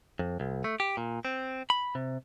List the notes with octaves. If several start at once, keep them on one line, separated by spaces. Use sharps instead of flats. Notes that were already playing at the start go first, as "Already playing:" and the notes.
F2
C2
A3
G4
A#2
C4
B5
C3